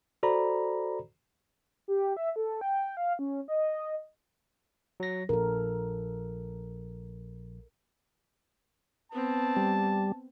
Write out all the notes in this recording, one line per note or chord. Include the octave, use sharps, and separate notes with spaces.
F#4 A4 C5 D5 A#5 B5
G4
E5
A4
G5
F5
C#4
D#5
F#3 A#6
A#1 A4 A#4
B3 C4 A5
G3